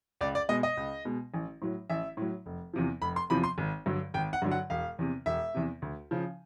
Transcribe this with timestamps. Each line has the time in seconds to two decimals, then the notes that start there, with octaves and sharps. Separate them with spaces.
0.21 C#2 D5
0.35 D5
0.49 B2 G#3 D#5
0.63 D#5
0.77 C#2
1.05 B2 G#3
1.34 A1
1.62 A2 F#3
1.90 A1 E5
2.17 A2 F#3
2.46 F1
2.73 E2 C3 F3
3.02 F1 B5
3.16 C6
3.30 E2 C3 F3 B5
3.44 C6
3.58 G#1
3.86 G2 D3 F#3
4.14 G#1 G5
4.33 F#5
4.42 G2 D3 F#3
4.51 F#5
4.70 E1 F5
4.99 E2 C3
5.26 E1 E5
5.55 E2 C3
5.82 D2
6.11 C#3 F3